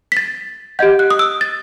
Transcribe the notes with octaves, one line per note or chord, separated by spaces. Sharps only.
B6
A6
G4 D#5 F#5 G6
F#6
D#6
E6
A6